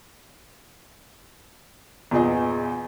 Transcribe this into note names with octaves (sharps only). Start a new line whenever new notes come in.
E2 A#2 G#4 D#5